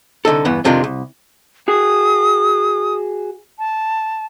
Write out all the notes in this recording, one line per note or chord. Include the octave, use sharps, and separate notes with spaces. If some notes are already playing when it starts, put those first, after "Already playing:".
C2 D3 D#4 A4
E2 G2 E3 B3
F2 C3 D#3 G#3 D4 F4
C2
F#4 G#4 D#6
A5